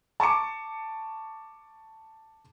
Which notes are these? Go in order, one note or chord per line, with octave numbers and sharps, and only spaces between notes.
A5 C#6 D6 C#7